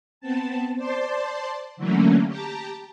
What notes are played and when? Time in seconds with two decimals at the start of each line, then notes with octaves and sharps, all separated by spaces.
0.21 B3 C4 A5
0.76 C5 D5 A5 C6
1.77 D3 E3 F#3 A3 A#3 C#4
2.27 G4 A5 A#5